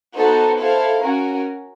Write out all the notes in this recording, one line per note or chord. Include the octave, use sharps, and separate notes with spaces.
B3 D#4 F#4 A4 C5
E4 A4 C5 F5
C#4 F#4 A#4